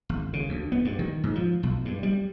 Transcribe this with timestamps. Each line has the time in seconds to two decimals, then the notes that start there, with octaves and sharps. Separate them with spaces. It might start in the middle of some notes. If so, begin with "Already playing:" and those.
0.09 G#1
0.33 C#3
0.49 D2
0.72 B3
0.85 G2
0.99 D#3
1.24 G#2
1.35 F3
1.63 B1
1.85 G2
2.03 G3